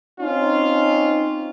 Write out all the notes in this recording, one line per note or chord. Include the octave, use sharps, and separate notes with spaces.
C4 C#4 D#4 F4